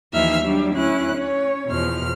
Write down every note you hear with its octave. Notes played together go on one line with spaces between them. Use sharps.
D#2 E3 F3 D#4 E5 F6
F#3 G3 D4
D2 C#4 E4 F#6
C#4 C#5
E2 B2 F3 F6